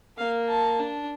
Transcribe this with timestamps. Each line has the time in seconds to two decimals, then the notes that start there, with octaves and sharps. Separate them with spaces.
0.18 A#3 F5
0.48 A5
0.79 D4